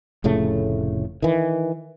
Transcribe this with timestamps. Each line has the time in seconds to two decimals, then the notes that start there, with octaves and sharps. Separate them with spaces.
0.24 F1 A2 C#3 A3
1.22 D#3 E3